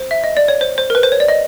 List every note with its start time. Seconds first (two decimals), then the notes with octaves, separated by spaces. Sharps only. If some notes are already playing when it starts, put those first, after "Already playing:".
Already playing: C5
0.11 E5
0.24 D#5
0.37 D5
0.48 C#5
0.61 C5
0.78 C5
0.90 A#4
0.95 B4
1.03 C5
1.12 C#5
1.20 D5
1.28 D#5